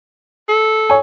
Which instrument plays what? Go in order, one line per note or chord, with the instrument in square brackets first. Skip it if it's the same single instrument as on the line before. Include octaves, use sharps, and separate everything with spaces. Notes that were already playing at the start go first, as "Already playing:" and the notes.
[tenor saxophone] A4
[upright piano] C#5 G#5